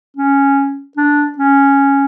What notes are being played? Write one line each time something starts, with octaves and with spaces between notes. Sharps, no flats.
C#4
D4
C#4